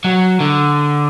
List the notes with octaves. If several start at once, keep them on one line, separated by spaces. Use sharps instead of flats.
F#3
D3